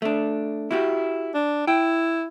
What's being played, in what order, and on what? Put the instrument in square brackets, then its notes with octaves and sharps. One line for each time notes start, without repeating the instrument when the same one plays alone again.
[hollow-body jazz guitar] A3 D4
E4 F#4 G4
[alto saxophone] D4
[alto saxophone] E4 [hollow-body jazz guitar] G5